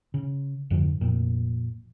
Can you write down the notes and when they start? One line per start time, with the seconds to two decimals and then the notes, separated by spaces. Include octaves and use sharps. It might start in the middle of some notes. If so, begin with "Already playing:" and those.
0.14 C#3
0.70 F2 G#2 D3 F3
1.01 F1 F2 A#2